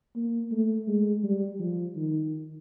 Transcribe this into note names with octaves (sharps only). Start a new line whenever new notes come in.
A#3
A3
G#3
G3
F3
D#3